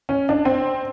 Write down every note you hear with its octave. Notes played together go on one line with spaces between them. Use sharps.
C#4
D4
C4